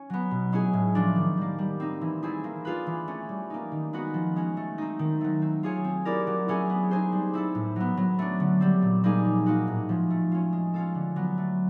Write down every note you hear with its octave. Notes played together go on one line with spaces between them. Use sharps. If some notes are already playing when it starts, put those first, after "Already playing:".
Already playing: C#4
F#3 B3
B2
G#3 C#4 E4 G#4
A2
F3 A3 D4
D#3
G3 A#3
G3
C4 D#4
E3
A3 C4 E4 G#4
A#3
D4 F4 G#4 B4
E3
A3 C#4
G3
A#3 D#4
D#3
G#3 B3 D#4 F#4
F3
G#3 C#4 F#4
A3
C4 D#4
D#3
F#3 A3
C4
F4 G#4 C#5
C4
E4 G4 A#4 D5
F#3
A3 C#4 E4 G#4
B3
D#4 G#4 C5
G3
C4 E4 A4
A2
F#3 B3
F#3
A3 D4
D3
G3 C4
A#2
G3 A#3 D#4 G#4
F3
A#3 D#4 F#4
A2
F3 G#3
A3
C#4 F4
G#3
C#4 F4 A4
D3
F#3 B3
A3